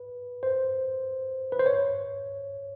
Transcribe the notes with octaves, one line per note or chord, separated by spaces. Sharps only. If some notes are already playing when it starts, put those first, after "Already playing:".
Already playing: B4
C5
B4
C5
C#5